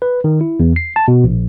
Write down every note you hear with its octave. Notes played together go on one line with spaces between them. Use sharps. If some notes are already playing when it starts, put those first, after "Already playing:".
B4
D#3
E4
E2
C7
A5
B2
A#1